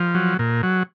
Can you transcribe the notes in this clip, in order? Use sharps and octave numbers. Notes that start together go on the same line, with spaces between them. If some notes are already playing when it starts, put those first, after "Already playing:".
Already playing: F3
F#3
A#2
F#3